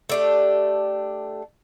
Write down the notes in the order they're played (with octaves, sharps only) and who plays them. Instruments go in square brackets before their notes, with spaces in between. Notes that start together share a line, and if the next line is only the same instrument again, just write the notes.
[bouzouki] A3 D4 G4